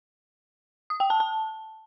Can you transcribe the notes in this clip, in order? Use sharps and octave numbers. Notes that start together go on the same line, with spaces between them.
D#6
G5
A5
A5